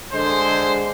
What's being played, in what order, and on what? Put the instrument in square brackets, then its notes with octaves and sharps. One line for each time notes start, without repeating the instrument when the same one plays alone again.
[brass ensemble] D3 G#3 C5